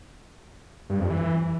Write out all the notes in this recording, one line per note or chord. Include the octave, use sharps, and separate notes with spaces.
G2
F2
E3